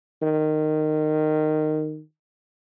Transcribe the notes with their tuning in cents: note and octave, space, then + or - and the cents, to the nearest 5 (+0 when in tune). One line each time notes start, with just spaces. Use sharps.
D#3 -15